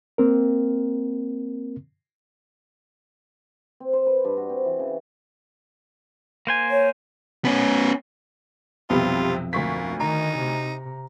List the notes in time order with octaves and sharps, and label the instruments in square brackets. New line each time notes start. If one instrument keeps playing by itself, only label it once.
[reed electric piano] A#3 C4 A#4
[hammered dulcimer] C4
C5
B4
G2
F#4
C4
E3
C#3
[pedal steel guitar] A#3 C5 G#5
[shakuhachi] C#5
[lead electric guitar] B3 C#4
[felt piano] B1 F2 [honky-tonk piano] C3 G3 B3 [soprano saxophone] F4
[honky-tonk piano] D2 C#6 B6 [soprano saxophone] A#3
[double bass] D#3 [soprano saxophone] D#4 [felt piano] A#5
[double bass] C3